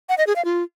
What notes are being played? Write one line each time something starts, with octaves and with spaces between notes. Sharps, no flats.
F#5
D#5
G#4
F5
F4